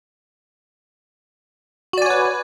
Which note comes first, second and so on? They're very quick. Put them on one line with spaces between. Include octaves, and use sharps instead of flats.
F#4 D5 G#5 C#5 B4